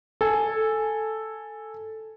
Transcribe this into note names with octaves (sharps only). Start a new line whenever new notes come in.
A4 G#5